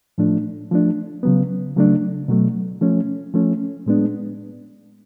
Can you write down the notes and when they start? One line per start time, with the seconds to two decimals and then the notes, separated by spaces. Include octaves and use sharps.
0.18 A2 F3 A3 D4
0.71 F3 A3 D4
1.23 C#3 F#3 B3
1.76 C#3 F#3 A3 D4
2.28 B2 F#3 A3
2.81 F3 A3 C#4
3.34 F3 A3 C#4
3.86 A2 G#3 B3 D4